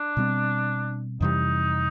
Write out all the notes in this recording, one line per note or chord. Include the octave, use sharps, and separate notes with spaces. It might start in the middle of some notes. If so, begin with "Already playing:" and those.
Already playing: D4
B2 G3 C4
F2 C3 E3 G3 D#4